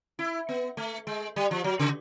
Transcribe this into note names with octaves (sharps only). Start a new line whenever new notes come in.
E4
B3
A3
G#3
G3
F3
F#3
C#3